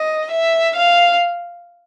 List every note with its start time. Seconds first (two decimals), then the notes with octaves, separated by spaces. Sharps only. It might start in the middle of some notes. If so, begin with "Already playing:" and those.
Already playing: D#5
0.31 E5
0.75 F5